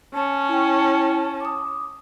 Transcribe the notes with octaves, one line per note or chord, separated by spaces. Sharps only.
C#4 A5
E4 G5
D6 D#6